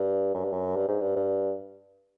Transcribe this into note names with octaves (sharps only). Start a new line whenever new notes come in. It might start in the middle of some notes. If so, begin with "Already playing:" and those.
Already playing: G2
F#2
G2
F#2
G2
G#2
G2
G2